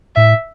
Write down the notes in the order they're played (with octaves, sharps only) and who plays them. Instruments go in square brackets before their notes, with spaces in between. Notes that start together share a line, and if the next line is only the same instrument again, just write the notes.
[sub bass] A2 [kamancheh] E5